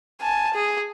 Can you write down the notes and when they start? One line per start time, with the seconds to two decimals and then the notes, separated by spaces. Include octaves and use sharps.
0.21 G#5 A5
0.54 G#4